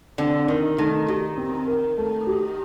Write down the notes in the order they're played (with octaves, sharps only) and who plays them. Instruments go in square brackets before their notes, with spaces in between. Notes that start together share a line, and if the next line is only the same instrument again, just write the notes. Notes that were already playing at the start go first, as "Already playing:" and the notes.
[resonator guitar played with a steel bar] D3 [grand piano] C4
[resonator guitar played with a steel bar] D#3 [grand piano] A#4
[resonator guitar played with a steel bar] D#3 [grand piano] A3
[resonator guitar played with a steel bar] D#3 [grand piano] G4
[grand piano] C4
A#4
A3
G4